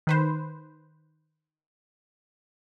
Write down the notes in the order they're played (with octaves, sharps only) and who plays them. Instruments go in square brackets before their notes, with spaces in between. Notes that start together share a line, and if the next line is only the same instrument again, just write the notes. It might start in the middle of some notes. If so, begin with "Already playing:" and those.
[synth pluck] D#3 B4 C5